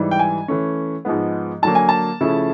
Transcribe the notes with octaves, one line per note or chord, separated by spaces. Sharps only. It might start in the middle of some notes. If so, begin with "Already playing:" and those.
Already playing: G#2 E3 G3
G5
G#5
E3 A3 C#4
G#2 F3 G#3 B3
D3 F#3 A#3 A5
G#5
A5
C#3 F3 A3 C#4 E4